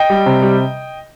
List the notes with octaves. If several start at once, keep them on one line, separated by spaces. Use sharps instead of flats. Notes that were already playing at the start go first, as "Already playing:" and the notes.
Already playing: D#5 G5
G3
C3
G3